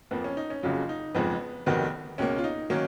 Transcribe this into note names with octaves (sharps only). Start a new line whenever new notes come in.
F2 F3 A#3 B3
C#4
D#4
C#4
F#1 F2 C#3 F#3 F4
D#4
F#1 F2 F3 G#3 B3
F1 F2 D#3 F#3 B3
C#2 B2 A#3 C#4
F4
D#4
D#3 F#3 A#3 C#4